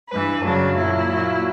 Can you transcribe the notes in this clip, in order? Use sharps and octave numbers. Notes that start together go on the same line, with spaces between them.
G2 E3 B4
F#2 C#3 F#3 D4
A#2 F#3 E4
A#2 F#3